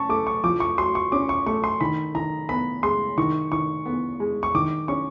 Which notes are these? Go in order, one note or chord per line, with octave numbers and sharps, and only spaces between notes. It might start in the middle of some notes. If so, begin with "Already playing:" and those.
Already playing: C#4 A5 C#6
A3 D6
C#6
F3 D6
C#6
F#4 C6
C#6
C#4 D6
C#6
A3 C#6
C6
D#3 B5
D#3 A#5
B3 B5
G#3 C6
D#3 C#6
D#3 C#6
B3
G#3
C#6
D#3 D6
C#4 C#6